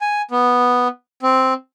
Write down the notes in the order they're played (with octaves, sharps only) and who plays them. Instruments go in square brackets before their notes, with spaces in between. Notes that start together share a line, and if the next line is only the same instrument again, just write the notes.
[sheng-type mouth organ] G#5
B3
C4